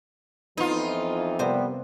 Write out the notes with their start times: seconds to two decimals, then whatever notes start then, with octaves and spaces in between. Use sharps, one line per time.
0.57 F2 E3 B3 D#4 F4
1.39 C3 G3 A#3 B3 C5